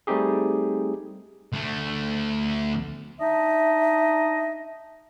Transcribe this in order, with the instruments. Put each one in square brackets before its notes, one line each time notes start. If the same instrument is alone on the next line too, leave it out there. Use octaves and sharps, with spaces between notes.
[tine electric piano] G3 A3 C4 D#4 G4 G#4
[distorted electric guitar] D2 A3
[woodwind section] D4 D#4 D#5 E5